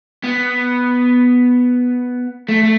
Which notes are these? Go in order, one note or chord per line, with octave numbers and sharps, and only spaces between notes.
B3
A3
A3